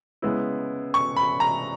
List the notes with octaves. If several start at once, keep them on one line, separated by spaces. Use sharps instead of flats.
C#3 G#3 B3 E4
C#6
B5
A#5